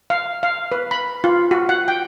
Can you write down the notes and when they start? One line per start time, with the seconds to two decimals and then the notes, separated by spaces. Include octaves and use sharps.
0.10 F5
0.43 F5
0.72 B4
0.91 B5
1.24 F4
1.51 F#4
1.69 F#5
1.88 G5